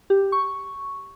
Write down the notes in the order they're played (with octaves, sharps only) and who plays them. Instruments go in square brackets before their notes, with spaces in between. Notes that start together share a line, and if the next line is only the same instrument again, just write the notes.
[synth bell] G4
C#6